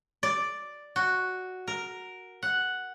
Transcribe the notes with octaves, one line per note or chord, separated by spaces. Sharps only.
D5
F#4
A#4
F#5